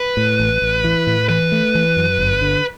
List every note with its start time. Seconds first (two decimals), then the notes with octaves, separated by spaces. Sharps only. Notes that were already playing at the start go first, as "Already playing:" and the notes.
Already playing: B4
0.17 A2
0.40 A1
0.62 A1
0.84 E3
1.07 A2
1.29 E3 B4
1.52 A3
1.75 E3
1.96 F#2
2.19 G1
2.42 D3